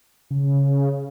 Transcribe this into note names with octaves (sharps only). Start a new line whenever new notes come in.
C#3